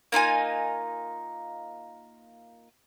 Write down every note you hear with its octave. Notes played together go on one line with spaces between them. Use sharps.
A#3 D#4 F4 G#5